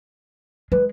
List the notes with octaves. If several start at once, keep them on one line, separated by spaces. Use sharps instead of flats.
G#3 B4